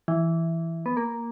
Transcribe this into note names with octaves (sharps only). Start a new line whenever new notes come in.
E3
B3
A#3